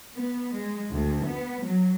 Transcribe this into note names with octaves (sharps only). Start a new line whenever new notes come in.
B3
G#3
D2
B3
F#3